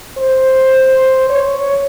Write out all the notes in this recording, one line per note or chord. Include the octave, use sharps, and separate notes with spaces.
C5
C#5